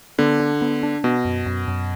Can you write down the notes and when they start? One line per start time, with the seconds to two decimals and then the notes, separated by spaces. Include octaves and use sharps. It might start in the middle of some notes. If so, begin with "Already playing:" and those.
0.18 D3 B3
0.40 D4
0.62 B3
0.83 D4
1.04 B2 B3
1.25 F#2
1.46 F#2
1.68 F#2